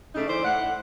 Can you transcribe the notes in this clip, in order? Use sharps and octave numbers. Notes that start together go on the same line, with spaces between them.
C#3 A3 D4 D#4
E3 C5 D5
A2 F#5